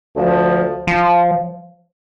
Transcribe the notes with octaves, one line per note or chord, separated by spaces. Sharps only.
D2 D3 F3
F3